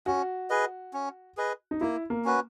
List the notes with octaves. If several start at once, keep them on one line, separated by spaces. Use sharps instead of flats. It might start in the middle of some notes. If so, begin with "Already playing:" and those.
C#4 F#4
G#4 B4 D#5
C#4
G#4 B4 D#5
D#4
A#3 E4
A#3
C#4 F#4 B4